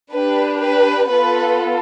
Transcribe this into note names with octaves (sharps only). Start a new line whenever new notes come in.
D4 G4 B4
B4
B3 F4 A4 B4